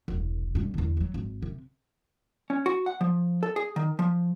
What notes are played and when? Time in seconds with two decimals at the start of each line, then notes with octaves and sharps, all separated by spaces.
0.08 E1 C2
0.55 G2 B2
0.74 E2 D3
0.97 F#3 G#3
1.14 G#1
1.42 C3
2.50 C#4
2.66 F#4
2.86 F#5
3.01 F3
3.43 A4
3.56 G#4
3.76 D#3
3.99 F3